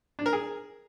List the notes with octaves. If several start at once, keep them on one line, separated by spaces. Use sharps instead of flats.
D4
A#4
G#4